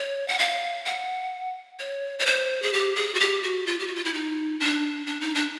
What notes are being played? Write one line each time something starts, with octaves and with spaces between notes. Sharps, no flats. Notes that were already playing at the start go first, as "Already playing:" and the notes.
Already playing: C#5
F#5
F5
F#5
C#5
C#5
C5
G#4
G4
G#4
F#4
G4
F#4
F4
G4
F#4
F4
E4
D#4
D4
D4
D#4
D4